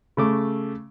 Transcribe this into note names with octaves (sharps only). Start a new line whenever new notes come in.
C#3 A3 D6